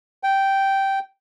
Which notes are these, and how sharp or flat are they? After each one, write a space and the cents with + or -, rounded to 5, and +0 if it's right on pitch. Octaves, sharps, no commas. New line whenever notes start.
G5 -10